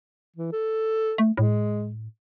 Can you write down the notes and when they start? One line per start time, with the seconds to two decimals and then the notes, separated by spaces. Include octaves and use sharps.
0.36 E3
0.53 A4
1.18 A3
1.37 A2 G#3